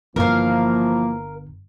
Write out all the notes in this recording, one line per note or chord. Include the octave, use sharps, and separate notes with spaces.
G1 E3 F3 A#3 A#4 F5